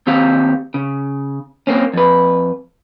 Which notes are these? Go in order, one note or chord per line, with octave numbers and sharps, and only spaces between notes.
D#2 C4 G4 F5
C#3
A#3 C4 C#4
F2 B4